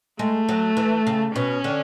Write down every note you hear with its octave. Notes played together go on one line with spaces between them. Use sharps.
G#3 A3
F#3
E3
C#3
B2 C#4
D3